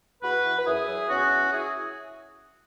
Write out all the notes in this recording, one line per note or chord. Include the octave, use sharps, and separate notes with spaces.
E2 F#4 B4
E3
B4
F#2 E4 G#4
F#3
E2 C#4 F#4
E3
E4 G#4